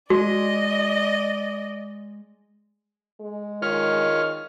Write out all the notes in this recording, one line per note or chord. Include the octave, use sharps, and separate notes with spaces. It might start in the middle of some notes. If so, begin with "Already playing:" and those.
G#3 F#4 D5 D#5
G#3
D#3 F4 C#5 F6